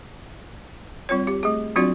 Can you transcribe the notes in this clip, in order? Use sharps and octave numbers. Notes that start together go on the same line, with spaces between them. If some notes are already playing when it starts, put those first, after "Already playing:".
G3 C4 F4 C#5
G4
A3 G#4
F#3 C4 D4 F4 F#4 D5